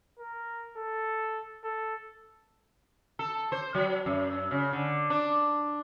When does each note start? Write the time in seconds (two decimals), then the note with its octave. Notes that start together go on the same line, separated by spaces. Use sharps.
0.19 A#4
0.77 A4
1.64 A4
3.19 A4
3.52 C5
3.75 F#3
4.06 F#2
4.51 C#3
4.73 D3
5.10 D4